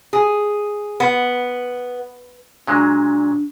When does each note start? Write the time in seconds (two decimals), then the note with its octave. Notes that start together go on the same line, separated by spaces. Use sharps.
0.13 G#4
1.00 B3
2.67 A#2 F#3 G#3 D4